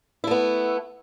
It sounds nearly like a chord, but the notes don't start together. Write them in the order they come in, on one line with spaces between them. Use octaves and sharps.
E4 A3 B3